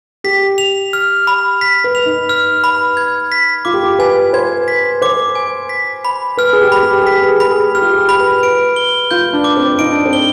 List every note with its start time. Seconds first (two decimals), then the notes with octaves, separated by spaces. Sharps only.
0.24 G4 B6
0.58 F7
0.93 F6
1.27 B5
1.61 B6
1.84 B4
1.95 F7
2.06 D#4
2.29 F6
2.64 B5
2.97 G#6
3.32 B6
3.65 F4 D6
3.74 G4
3.83 F4
3.99 B4 G#5
4.33 C5 G#6
4.57 B4
4.68 B6
4.79 B4
5.02 C5 D6
5.35 G#5
5.69 B6
6.05 B5
6.37 B4 F6
6.53 G#4
6.61 G4
6.72 B5
6.83 G4
7.02 G#4
7.06 G4 B6
7.23 B4
7.28 G#4
7.40 B5
7.52 G#4
7.75 G4 F6
7.82 F4
7.89 G4
7.97 G#4
8.09 B5
8.20 B4
8.43 B4 D7
8.76 G7
9.11 F4 G6
9.33 D4
9.44 D6
9.57 C4
9.79 D#4 D7
9.91 D4
10.06 C4
10.13 G7